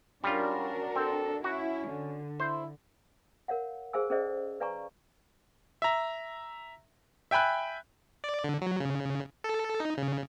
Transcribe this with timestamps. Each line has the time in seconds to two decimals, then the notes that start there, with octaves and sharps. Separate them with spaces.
0.24 G3 C#4 D4 F4 F#4 A#4
0.95 C4 A4
1.44 C#4 E4 F#4
1.89 D3
2.40 E4 C5
3.48 A#4 C#5 F5 F#5
3.93 G#4 C5 F5 G#5 E6
4.10 C#4 G#4 A4 C5 D5 D#5
4.60 B4 D5 F5 G#5 A#5 C#6
5.82 E5 A#5
7.31 E5 G5 G#5 B5 F#6
8.24 D5
8.44 D3
8.61 F#3
8.80 C#3
9.44 A4
9.80 D#4
9.97 C#3